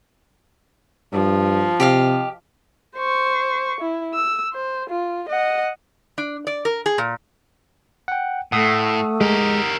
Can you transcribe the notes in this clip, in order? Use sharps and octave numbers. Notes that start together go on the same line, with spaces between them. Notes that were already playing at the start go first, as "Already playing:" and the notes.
G2 F3
C3 G4 D#5 F5
C5 C#6
E4
E6
C5
F4
D#5 F#5
D4
D5
A#4
G#4
A#2
F#5 G5
A2 A3 F#5 D#6 E6
G#3 G4 A#4